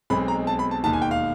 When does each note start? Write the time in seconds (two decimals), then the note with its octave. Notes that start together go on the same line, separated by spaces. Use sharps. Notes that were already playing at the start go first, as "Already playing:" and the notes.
0.10 B1 B2 G#3 C4 B5
0.28 A#5
0.47 A5
0.59 B5
0.71 A5
0.84 E1 D#2 D#3 A5
0.93 G#5
1.02 G5
1.11 F5